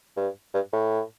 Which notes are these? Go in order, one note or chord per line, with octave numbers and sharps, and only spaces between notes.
G2
G2
A2